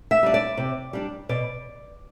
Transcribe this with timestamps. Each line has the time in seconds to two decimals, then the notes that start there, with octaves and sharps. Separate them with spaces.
0.11 E5
0.23 G3 D4
0.34 D5
0.57 C3
0.93 G3 D4
1.29 B2 D5